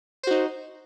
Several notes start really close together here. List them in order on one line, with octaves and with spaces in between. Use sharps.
C5 F#4 D#4